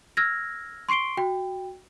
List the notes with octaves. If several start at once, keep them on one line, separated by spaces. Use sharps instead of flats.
E6 F6 G#6 A#6
C6 C#6 C7 D7 G7
F#4 G5